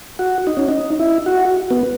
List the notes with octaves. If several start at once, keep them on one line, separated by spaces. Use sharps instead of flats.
F#4
D#4
C#4
D#4
E4
F#4
B3